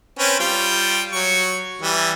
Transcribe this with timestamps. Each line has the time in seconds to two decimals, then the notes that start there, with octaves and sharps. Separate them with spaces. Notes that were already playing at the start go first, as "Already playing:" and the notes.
0.19 C4 C#4 B4
0.40 G3 F4 G5
1.13 F#3 C#6
1.82 E3 G3